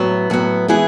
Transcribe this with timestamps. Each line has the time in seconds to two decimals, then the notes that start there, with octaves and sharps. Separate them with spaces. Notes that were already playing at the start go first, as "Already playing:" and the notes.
Already playing: A2 F#3 B3
0.30 A2 F#3 B3
0.68 E3 G#3 B3 E4 G#4